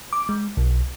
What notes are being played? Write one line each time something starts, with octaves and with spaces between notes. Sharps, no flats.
D6
G#3
B1